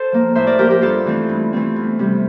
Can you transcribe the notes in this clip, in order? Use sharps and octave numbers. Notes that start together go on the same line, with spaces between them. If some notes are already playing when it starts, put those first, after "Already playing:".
Already playing: A4 C5
F3 A#3
A2 C5 E5
A#4 D5
F3 A#3 G4 A#4
G4 A#4
G2 F4 A4
E3 A3 C4
G2
E3 A3 C4
E2
C3 G3